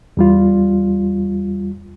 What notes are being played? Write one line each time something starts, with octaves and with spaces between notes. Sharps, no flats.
E2 G3 F4